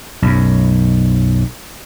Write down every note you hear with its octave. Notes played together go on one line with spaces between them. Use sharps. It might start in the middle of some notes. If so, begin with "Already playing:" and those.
B1 F#2